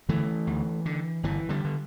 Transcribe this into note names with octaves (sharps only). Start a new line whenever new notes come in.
D3 E3 A3
D2
D3
G1 E3
D3 G3
D3